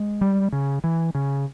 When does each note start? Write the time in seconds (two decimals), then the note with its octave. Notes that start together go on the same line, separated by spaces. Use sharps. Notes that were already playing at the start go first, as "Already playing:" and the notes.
Already playing: G#3
0.21 G3
0.53 C#3
0.84 E3
1.15 C#3